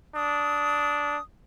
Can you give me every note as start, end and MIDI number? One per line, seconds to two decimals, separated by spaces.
0.15 1.17 62
0.15 1.22 87